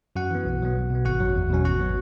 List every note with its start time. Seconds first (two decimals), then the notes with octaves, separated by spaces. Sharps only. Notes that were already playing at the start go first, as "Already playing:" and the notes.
0.16 F#2 F#4 F#5
0.30 E3 B3
0.45 B1
0.60 B2 F#3 B3
0.76 B1
0.90 B2 B3
1.05 G#1 F#4 F#5
1.20 F#2 F#3
1.35 E2
1.50 B2 F#3 C#4
1.65 G#1 F#4 F#5
1.80 F#3 B3